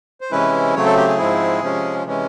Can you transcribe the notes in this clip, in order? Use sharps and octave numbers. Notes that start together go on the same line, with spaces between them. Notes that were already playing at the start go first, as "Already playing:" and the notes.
C5
C3 E3 G#3 C#4 E4 B4
C#3 F#3 A3 C4 C#5
A4
G4
G#4
G#2 F3 G#3 C4 E4
C3 F3 G#3 C#4
C3 E3 G#3 C#4